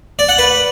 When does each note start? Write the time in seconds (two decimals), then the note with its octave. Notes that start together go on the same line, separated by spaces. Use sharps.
0.19 D5
0.29 F#5
0.38 B4